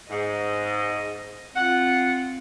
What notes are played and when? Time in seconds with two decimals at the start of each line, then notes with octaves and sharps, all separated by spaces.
0.10 G#2 D#5
1.56 C4 F4 F#5